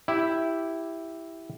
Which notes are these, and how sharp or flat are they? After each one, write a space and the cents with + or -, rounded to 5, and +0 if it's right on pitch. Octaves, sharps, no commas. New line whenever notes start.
E4 +0 G4 +0